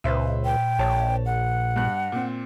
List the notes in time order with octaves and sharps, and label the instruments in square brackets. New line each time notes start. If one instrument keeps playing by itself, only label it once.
[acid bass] C#2 [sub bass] A#2 [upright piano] B4 C5 E5
[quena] G5
[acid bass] A#1 [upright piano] C#5 A5
[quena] F#5
[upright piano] G2 F#6
A#2 C4